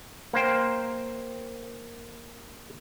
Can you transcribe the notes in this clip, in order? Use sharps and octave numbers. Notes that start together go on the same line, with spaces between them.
A#3 C5 G5